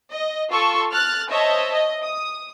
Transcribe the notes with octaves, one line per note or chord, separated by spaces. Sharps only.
D#5
F4 A4 C#6 E6
F6 F#6 A6
C5 C#5 D#5 E5 A5
D#5
D#6